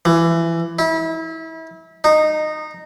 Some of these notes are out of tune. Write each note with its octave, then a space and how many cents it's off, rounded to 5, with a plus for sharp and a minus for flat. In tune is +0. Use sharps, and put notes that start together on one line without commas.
E3 +20
E4 -30
D#4 -15